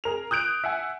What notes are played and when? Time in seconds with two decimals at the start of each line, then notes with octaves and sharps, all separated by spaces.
0.04 G#4 A#4 F7
0.31 D#6 F#6 G6 D7 F7
0.64 E5 F#5 G#5